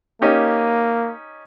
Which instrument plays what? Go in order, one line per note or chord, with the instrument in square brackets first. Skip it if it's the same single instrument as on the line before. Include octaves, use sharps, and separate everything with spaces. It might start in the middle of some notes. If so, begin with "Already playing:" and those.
[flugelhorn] A#3 [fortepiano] C#4 D#4 G4